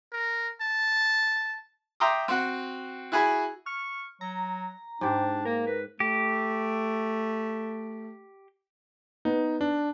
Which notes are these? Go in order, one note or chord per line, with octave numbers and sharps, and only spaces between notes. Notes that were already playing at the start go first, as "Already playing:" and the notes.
A#4
A5
E5 G5 A#5 C6 D6 D#6
C4 F#4 F#5
E4 F#4 G#4 G#5 B5
C#6 F6
F#3 A#5
G#2 D4 G4
A#3 A#4
B4
A3 G4
B3 D#4
D4